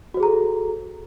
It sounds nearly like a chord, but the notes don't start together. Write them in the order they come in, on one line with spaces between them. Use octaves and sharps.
F#4 C5 G#4 A#5 A4